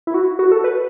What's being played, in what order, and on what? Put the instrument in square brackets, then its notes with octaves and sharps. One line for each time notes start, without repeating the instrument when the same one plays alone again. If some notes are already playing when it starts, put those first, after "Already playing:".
[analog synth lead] E4
F#4
F#4
A4
B4